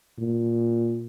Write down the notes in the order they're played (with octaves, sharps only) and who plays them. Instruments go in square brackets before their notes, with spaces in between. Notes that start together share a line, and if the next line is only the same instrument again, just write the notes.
[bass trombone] A#2